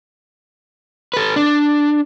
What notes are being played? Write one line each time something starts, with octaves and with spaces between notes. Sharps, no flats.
A4 B4
D4